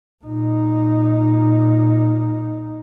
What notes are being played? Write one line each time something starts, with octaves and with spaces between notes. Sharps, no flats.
A#2 D#4